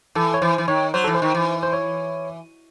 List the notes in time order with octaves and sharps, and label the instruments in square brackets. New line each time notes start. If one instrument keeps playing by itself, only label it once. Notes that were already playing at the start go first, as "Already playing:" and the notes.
[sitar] E3 [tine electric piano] A4
[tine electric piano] C#5
[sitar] E3 [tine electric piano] C5
[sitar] E3
[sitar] D#3 [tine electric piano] C#5
[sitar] F#3 [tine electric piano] C5
[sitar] E3 [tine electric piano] A4
[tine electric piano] C5
[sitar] D#3
E3
[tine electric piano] C5
C#5